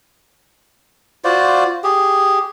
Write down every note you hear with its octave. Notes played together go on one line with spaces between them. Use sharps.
F4 F#4 C5 D5
G4 G#4